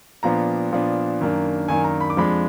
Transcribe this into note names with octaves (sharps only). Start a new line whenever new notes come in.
A#2 F3 B3 D4 A#5
A#2 F3 B3 D4
F#2 D#3 A#3 D4
F#2 D#3 A#3 D4 G#5
A#5
B5
D6
F2 F3 G#3 D4 B5